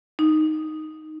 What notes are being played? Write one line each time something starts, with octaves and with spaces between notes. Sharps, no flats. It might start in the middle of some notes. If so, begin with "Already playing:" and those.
D#4